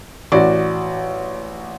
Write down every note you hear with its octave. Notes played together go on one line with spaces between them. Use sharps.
A1 F#4 D5